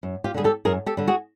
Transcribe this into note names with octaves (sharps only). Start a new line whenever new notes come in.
F#2
F4 G4
D3 G3 G#4
G4 A4
F#2 G#4 A#4
G4 A4
D3 G3
F#4 G#4